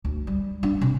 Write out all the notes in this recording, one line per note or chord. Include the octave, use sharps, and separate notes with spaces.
D2
G3
D4
C3